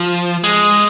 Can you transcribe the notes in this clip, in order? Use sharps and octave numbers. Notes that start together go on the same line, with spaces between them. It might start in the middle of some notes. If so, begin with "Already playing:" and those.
Already playing: F3
G#3